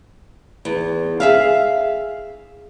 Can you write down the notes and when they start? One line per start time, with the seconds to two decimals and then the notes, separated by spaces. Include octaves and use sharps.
0.65 E2
1.20 G#4 E5 F5